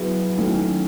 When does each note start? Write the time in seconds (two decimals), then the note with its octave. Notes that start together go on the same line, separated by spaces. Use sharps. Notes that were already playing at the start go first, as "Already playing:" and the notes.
Already playing: F#3 B3 E4 G#4
0.38 D#3 F#3 A3 C#4 E4